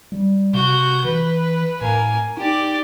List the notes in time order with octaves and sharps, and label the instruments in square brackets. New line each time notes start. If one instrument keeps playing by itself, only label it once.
[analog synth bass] G3
[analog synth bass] C3 [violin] F#4 G6
[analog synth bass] E3 [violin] B4
[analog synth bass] A2 [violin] A#3 G#5
[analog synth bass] D#4 [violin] G4 D5